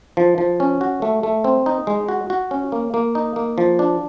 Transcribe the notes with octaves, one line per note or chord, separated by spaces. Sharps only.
F3
F3
C#4
F#4
A3
A3
C4
D#4
G#3
F#4
F#4
C#4
A#3
A#3
D#4
A#3
F3
D4